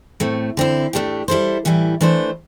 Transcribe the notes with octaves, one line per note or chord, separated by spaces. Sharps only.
A2 A3 C4
D3 C4 E4
A2 A3 D4 G4
G3 E4 A4 C5
A2 E3 G3 E4
E3 A3 D4 C5